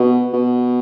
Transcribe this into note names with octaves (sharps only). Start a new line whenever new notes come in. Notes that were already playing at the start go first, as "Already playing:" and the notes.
Already playing: B2
B2